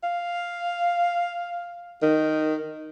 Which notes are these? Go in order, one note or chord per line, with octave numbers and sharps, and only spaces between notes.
F5
D#3